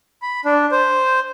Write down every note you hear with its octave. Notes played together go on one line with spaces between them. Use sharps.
B5
D4
C5